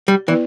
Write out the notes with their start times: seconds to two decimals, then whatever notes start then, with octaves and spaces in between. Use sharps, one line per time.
0.08 G3
0.28 E3 B3 E4 B4 D5